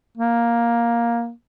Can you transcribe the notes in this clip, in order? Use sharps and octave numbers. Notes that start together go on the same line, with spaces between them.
A#3